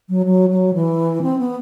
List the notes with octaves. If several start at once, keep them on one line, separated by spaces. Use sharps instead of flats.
F#3
F#3
F#3
E3
C4
B3